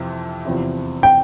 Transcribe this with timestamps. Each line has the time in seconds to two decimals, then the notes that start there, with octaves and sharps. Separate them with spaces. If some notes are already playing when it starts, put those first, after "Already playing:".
Already playing: F2 C3 E3 C4
0.45 E2 C3 F3 C4 E4
1.03 G5